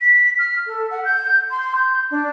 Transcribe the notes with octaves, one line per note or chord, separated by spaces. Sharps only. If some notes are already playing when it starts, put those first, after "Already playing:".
B6
F6
A4
F#5
G6
C6
G6
D4